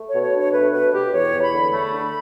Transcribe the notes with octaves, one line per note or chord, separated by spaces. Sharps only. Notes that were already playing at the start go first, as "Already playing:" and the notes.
Already playing: A3
B2 C#5
C#5
D4 C#5
A3 B4
B2 B4
B2 G4
E2 C#5
E2
B5
D3
A3 B5
D3